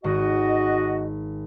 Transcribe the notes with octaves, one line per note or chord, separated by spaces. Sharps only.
G#1 F#4 D#5